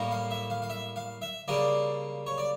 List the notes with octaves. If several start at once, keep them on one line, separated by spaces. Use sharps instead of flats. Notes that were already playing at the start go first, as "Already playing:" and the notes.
Already playing: A2 G3 A#3
F5
E5
F5
F5
E5
F5
E5
C#3 G3 A#3 D5
C#5
D5